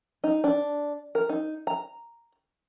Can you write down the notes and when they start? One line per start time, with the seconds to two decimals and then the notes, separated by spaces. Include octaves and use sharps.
0.24 D#4
0.44 D4
1.15 A#4
1.29 D#4
1.67 A#5